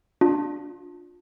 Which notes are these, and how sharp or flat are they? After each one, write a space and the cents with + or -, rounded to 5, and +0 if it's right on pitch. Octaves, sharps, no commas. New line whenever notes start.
D4 +0 F4 +25